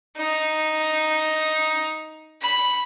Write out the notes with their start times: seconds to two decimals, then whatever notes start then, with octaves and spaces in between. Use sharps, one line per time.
0.17 D#4
2.42 B5